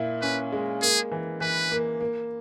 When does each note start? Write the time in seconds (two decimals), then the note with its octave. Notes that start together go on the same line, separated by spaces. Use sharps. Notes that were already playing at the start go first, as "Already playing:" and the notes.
Already playing: A#2 E4
0.22 C#4 B4
0.52 G#3
0.82 A#3 G#4
1.12 E3
1.41 E3 B4
1.71 A#3
2.01 A#3